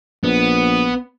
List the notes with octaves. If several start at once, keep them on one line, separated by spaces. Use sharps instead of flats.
A#1 B3